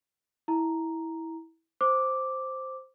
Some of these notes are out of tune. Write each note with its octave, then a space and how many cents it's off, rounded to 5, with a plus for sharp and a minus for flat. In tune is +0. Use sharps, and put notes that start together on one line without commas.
E4 -15 A#5 +0
C5 +0 D6 +0